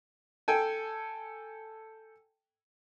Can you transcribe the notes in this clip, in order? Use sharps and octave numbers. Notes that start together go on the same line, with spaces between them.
A4 G5 G#5